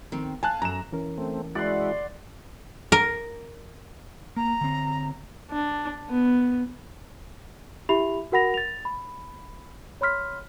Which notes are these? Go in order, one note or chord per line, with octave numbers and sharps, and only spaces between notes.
D#3 C4
F5 G#5 A5 F#6
F#2 A#5 E7
E3 C#4 A#4
A3 C4
G#3 E4 F#4 D5 F#5 C6
A#4
A#3 A#5
D3 C4
D4
B3
E4 G4 E5 B5 F7
F#4 A#4 F#5 B5 A#6 F7
A6 F7
B5
C#5 B5 C6 F6 B6